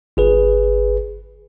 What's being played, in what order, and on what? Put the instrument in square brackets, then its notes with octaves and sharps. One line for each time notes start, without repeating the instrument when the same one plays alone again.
[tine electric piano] G1 G#4 B4